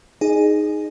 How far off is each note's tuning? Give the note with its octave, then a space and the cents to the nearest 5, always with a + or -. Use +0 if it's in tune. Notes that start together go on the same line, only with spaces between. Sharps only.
D#4 +0 G#4 +0 D#5 -45